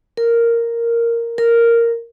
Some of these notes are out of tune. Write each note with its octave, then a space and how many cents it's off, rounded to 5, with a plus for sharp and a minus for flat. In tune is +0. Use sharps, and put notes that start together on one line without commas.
A#4 -5
A#4 -5